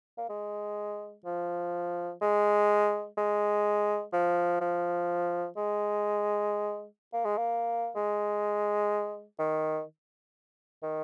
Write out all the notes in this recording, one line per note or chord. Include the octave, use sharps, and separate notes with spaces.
A#3
G#3
F3
G#3
G#3
F3
F3
G#3
A#3
G#3
A#3
G#3
D#3
D#3